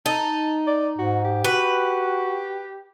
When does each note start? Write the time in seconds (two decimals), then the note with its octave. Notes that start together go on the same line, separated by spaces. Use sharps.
0.06 D#4 A5
0.67 D5
0.98 G#2 F#4
1.24 G4
1.44 F#4 B4